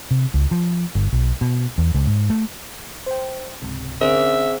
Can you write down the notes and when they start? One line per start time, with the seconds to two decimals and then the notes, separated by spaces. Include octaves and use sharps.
0.11 C3
0.34 C#2
0.51 F3
0.95 G1
1.13 B1
1.41 B2
1.78 E2
1.94 C#2
2.07 G#2
2.30 A3
3.06 C5 G5
3.62 C#2 G#2 C3
4.01 D3 C4 C#4 G#4 A#4 C5 E5